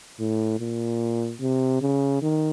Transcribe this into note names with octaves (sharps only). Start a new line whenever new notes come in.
A2
A#2
C3
C#3
D#3